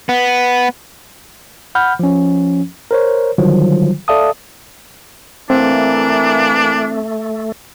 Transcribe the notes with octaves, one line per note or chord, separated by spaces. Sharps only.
B3
F#5 B5 F6 G6
F3 C#4
A#4 C5 C#5
D3 D#3 F#3 G3 F4 C5
A4 D5 E5 F5 A5 D#6
E3 A3 A#3 C4 D4